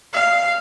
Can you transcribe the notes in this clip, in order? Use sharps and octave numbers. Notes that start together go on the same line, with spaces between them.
F5